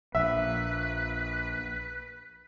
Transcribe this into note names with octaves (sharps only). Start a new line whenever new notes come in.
A#1 B4 E5